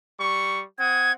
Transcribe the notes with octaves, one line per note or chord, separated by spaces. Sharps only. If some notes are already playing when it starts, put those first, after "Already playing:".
G3 C#6
C4 F#5 D#6 G#6